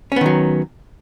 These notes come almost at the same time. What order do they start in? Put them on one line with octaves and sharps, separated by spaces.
C#4 B3 D#3 F#3